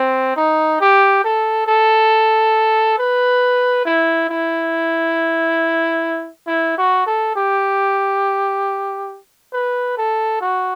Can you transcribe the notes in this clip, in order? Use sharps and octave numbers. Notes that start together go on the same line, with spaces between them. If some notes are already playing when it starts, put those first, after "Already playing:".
Already playing: C4
D#4
G4
A4
A4
B4
E4
E4
E4
F#4
A4
G4
B4
A4
F#4